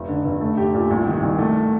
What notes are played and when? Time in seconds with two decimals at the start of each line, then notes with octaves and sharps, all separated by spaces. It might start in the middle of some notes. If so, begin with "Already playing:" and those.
Already playing: F1
0.08 D3
0.25 F1
0.41 A3
0.57 G4
0.74 A#2
0.91 C2
1.06 D#3
1.23 C2
1.39 A3